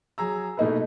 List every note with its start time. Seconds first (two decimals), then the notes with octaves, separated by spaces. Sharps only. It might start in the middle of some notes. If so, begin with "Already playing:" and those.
0.18 F#3 G#4 A#5 E6
0.57 B2 A3 A#3 D#4 E4 B4